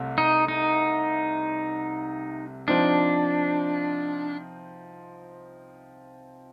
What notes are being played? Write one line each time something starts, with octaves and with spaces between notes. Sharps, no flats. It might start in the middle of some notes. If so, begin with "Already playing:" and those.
Already playing: C2 C3 A3 C4
D#4
D#4
F3 C4 D4 D#4